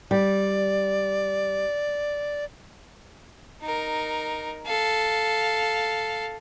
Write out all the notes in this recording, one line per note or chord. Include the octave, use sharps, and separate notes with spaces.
G3 D5
D#4 A#4
A4 F5